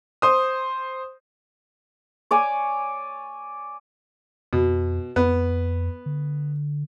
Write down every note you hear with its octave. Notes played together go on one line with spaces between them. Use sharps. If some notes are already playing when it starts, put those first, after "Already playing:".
C5 D#6
C#5 D5 G#5
F2 B2
F2 B3
D3